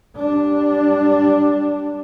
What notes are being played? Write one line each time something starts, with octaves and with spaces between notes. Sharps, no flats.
G3 D4